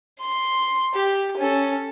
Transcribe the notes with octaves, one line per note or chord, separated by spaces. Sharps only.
C6
G4
C#4 A4